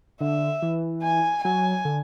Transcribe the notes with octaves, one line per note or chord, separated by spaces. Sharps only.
D3 E5
E3
G#5
F#3 G#5
D3